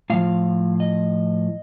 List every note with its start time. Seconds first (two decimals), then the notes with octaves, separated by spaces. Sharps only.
0.10 A2 F3 F5
0.80 D#5